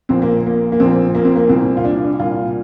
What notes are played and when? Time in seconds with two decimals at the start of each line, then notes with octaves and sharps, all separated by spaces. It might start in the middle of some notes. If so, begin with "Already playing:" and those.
0.09 A#1 A#2 C4
0.22 A#3
0.46 A#3
0.72 A#3
0.80 A#1 A#2 C4
1.15 A#3
1.25 C4
1.36 A#3
1.49 C2 A#2 C4
1.77 F4
1.85 D4
2.20 C2 A#2 F4